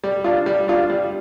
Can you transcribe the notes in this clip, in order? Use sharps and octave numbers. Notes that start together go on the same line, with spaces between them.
G3
D4 F4
G3
D4 F4
G3